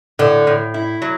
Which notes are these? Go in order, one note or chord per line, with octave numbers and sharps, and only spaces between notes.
A2 D3
A2
E4
F#3